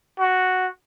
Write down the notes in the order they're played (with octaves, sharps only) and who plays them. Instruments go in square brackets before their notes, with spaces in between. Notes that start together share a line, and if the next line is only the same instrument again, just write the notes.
[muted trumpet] F#4